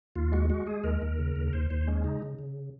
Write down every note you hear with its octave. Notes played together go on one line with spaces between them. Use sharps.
D#2 F4
G#3 F#4
G#3 F#4
G#3 G#4
D#2 A#4
D#2
C#3
D#2
A#4
D#2 C5
D#2 C5
G#3 C#4
C#3 D#4
C#3
C#3